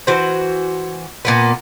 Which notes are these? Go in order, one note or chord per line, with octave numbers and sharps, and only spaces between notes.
E3 F#4 C5
A#2 A#3 B3